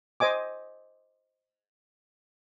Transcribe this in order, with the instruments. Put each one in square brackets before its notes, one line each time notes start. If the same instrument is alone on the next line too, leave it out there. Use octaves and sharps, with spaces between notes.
[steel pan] C5 D#5 G#5 D6